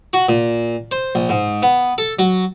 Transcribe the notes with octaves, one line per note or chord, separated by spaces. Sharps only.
F#4
A#2
C5
A#1
G#2
B3
A4
F#3